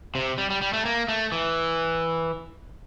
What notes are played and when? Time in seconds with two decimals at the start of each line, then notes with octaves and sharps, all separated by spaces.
0.15 C3
0.38 G3
0.50 G3
0.61 G3
0.73 A3
0.85 A#3
1.08 A3
1.32 E3